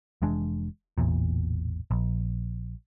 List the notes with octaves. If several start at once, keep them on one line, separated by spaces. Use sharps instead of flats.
F1 E3 G#3 D4
E1 A1 E2 A#2
A#1